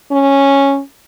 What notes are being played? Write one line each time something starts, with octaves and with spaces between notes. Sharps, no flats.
C#4